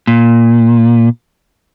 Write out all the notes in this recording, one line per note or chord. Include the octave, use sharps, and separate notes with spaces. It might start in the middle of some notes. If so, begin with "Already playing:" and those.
A#2